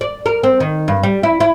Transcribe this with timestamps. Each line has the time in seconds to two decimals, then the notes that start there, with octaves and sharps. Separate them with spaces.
0.01 D5
0.26 A#4
0.43 C4
0.60 D#3
0.88 G2
1.03 G3
1.23 E4
1.40 E4